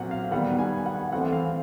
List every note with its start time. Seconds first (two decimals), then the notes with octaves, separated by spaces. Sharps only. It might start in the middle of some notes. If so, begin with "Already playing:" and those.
Already playing: A#2 F#3 C4 F#5
0.11 F5
0.31 D#3 G3 B3 F#5
0.59 G#5
0.86 F#5
1.12 E3 A3 C4 F#5
1.33 F5